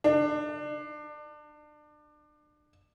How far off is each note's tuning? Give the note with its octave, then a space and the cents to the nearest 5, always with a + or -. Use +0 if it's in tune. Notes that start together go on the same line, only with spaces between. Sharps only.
D4 +30